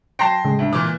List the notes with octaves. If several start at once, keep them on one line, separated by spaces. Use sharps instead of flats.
F#3 G5 A5 C6 A#6 C7
A2 C#3 G#3
D2
A#2 E3 D6